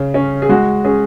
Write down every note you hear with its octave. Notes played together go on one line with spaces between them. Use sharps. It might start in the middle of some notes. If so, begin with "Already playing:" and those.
Already playing: C#3 C#4
C#4
G#4
G#3 F#4
C#4 G#4